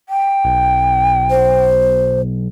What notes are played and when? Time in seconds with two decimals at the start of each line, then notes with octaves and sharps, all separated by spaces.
0.09 G5
0.44 B1
1.30 C5